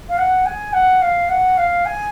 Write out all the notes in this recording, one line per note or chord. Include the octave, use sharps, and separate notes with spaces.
F5
F#5
G#5
F#5
F5
F#5
F5
G#5